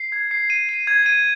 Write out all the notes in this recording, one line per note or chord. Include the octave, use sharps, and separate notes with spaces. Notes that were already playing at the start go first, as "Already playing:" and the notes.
Already playing: C7
G#6
C7
D#7
D#7
G#6
D#7